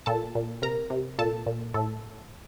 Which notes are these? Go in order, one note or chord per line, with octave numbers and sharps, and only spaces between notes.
A#2 A4 A5
A#2
C3 A#4 A#5
C3
A#2 A4 A5
A#2
A2 A4